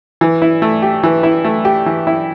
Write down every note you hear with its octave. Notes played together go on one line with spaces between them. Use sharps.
E3
E4
A3
G4
E3
E4
A3
G4
E3
E4